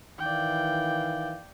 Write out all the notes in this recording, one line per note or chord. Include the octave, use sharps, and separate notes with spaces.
D#3 E3 D5 F5 G5